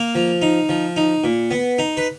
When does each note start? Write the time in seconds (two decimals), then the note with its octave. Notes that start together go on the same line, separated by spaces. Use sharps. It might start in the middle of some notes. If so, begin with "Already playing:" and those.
Already playing: A#3 F5
0.15 F3
0.42 D#4
0.69 F3
0.96 D#4
1.24 A#2
1.51 B3
1.78 D#4
1.97 B4